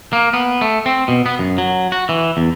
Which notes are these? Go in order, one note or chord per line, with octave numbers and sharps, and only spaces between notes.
A#3
B3
A3
C4
B2
B3
F#2
F#3
F#4
E3
E2